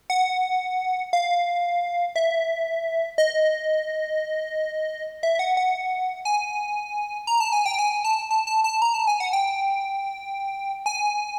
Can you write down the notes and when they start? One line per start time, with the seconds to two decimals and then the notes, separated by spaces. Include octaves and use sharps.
0.10 F#5
1.13 F5
2.16 E5
3.18 D#5
5.23 E5
5.39 F#5
5.57 F#5
6.25 G#5
7.27 A#5
7.40 A5
7.53 G#5
7.66 G5
7.79 G#5
8.04 A5
8.31 A5
8.47 A5
8.64 A5
8.82 A#5
8.94 A5
9.07 G#5
9.20 F#5
9.33 G5
10.86 G#5